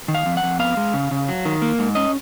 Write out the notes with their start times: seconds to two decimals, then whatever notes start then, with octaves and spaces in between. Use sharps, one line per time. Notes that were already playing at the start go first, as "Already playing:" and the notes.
0.08 D#3
0.15 F5
0.26 F2
0.37 F#5
0.43 F2
0.59 B3 F5
0.77 G#3
0.94 C#3
1.11 C#3
1.28 F#3
1.45 D#3
1.62 A#3
1.79 G#2
1.95 C#4 D#5